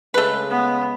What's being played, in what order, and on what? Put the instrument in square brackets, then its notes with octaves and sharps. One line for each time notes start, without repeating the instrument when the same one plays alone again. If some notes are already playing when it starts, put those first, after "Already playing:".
[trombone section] C#3 G#3 [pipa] A3 B4
[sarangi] B3